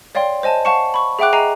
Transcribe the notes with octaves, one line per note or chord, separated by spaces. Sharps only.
C#5 D5 F5 G5 C6
C5 D#5 G#5 A5
F5 F#5 A5 C#6 C#7
B5 C#6
G#4 E5 F#5 G5 D6 F#6
G#4 D#5 G#5 A#5 C7